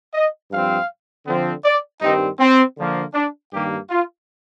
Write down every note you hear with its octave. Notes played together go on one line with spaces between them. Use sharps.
D#5
G2 F3 C4 F5
D3 F3 C4
D5
G2 D#3 G3 C4 D#4
C4
D3 F3 A#3
D4
G2 D#3 A#3 G4
F4